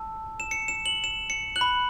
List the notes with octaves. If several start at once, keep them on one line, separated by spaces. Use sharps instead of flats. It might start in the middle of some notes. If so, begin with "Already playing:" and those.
Already playing: A5 E6
E7
C#7
E7
F#7
E7
C#7
F#6 F#7
B5